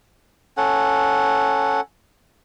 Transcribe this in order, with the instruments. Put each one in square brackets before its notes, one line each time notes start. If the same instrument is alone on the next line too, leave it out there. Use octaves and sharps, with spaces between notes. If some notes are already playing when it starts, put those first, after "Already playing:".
[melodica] C#4 A4 F#5